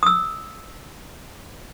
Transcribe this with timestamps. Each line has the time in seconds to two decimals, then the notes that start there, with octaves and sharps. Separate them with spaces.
0.03 D#6 E6